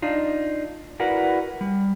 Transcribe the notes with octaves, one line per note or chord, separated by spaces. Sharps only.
D4 D#4 F4
E4 F#4 A#4 B4 D5 F#5
G3